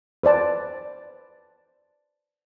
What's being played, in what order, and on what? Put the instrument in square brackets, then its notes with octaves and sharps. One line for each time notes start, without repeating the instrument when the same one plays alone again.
[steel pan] B4 C5 D5 A5